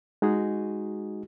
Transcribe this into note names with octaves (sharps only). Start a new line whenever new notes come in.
G#3 D#4 F#4 G#4